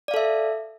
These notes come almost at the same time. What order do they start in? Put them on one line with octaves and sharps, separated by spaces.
D5 F5 A4 E5